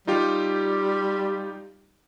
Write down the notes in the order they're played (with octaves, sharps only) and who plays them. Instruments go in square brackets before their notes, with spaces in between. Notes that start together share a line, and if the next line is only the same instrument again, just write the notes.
[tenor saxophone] G3 [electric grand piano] D#4 F4 G4